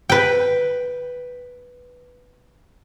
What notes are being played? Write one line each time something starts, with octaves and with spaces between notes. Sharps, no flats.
B4 G5